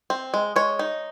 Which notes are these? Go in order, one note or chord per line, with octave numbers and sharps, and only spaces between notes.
C4
G#3
G#3 C#5
D#4